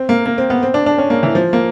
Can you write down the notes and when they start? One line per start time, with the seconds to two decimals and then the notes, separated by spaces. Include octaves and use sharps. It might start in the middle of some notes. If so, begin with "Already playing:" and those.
Already playing: C4
0.09 A#3
0.26 A#3
0.38 C4
0.50 B3
0.63 C4
0.74 D4
0.86 D4
0.98 C#4
1.10 A#3
1.23 E3
1.35 F3
1.53 A#3